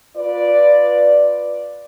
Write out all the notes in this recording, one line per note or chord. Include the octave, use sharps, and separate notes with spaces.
F4 B4 D5